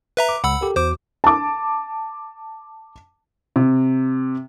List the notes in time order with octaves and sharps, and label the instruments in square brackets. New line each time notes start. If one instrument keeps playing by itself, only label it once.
[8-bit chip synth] B4 E5 A#5
[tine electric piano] D6
[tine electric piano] C#2 [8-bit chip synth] F#5 B5 E6
[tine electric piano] G4 A4 A#4
[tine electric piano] E2 F#4 D6 [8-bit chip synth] C5
[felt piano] A5 D6
C3